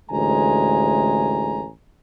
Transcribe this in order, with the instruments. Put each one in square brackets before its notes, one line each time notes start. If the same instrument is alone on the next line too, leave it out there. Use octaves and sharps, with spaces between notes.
[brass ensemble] A1 D2 G#3 G#5 A#5